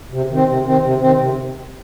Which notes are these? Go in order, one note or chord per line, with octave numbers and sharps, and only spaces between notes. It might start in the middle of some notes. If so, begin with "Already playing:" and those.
C3
D#3 C4
C3
D#3 C4
C3
D#3 C4
C3